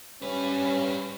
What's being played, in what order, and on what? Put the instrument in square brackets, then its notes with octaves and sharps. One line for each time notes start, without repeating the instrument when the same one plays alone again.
[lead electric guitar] G3 B4 [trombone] C#4